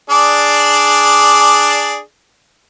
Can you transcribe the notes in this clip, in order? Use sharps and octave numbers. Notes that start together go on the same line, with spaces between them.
D4 G#4 D5